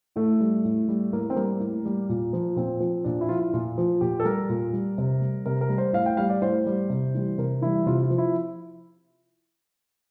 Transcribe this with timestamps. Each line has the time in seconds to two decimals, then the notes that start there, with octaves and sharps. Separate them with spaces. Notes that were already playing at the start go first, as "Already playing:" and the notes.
0.16 A2 A3
0.41 G3
0.65 A2
0.89 G3
1.13 A2 A#3
1.30 C4
1.36 G3 A#3
1.60 A2
1.85 G3
2.09 A#2
2.33 F3
2.56 A#2 C4
2.80 F3
3.04 A#2 D4
3.21 E4
3.29 F3 F4
3.37 E4
3.53 A#2 F4
3.78 F3
4.01 A#2 G4
4.20 A4
4.25 G3 A#4
4.49 A#2
4.73 G3
4.98 C3
5.21 G3
5.46 C3 A#4
5.61 A#4
5.69 G3
5.78 C5
5.93 A2 F5
6.06 G5
6.17 G3 F5
6.30 D5
6.42 A2 C5
6.67 G3
6.90 C3
7.15 E3 G3
7.38 C3 A#4
7.62 E3 G3 E4
7.86 C3 F4
8.03 F4
8.10 F3
8.18 E4